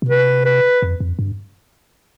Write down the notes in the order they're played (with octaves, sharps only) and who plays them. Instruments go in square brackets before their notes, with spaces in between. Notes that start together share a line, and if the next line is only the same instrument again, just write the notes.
[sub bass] B2
[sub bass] C3 [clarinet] B4
[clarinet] B4
[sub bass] F2
F2
G2